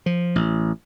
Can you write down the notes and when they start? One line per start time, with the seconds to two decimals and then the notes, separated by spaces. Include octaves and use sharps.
0.06 F3
0.36 A1